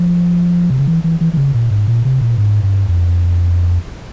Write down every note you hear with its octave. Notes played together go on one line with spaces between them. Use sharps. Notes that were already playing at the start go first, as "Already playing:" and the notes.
Already playing: F3
C3
C#3
E3
E3
E3
E3
C#3
A#2
G#2
A#2
C3
A#2
G#2
G2
F2